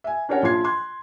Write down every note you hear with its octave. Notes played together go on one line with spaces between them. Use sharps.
E5 G#5
C#4 D4 G4 A#4 C#5 F#5
A#1 F3 F4 C6 G#6 C7
C6 F#6 G#6